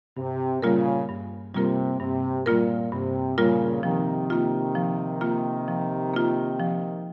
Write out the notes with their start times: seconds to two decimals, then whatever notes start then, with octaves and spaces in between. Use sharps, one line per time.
0.17 G2 C3
0.62 A#2 C#3 G3 A#3 F4 A#4
1.09 G2
1.54 C3 G3 A#3 F4 A#4
2.00 G2 C3
2.46 A#2 G3 A#3 F4 A#4
2.92 G2 C3
3.38 A#2 C#3 G3 A#3 F4 A#4
3.83 C3 D#3 F3
4.30 A#3 F4
4.75 F3
5.21 A#3 F4
5.68 F3
6.14 A#3 F4
6.59 F3